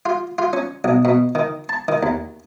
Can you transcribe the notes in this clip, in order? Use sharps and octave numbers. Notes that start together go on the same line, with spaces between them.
F4
F4
C#4
B1
B2
D#3
A5
D#3
D#2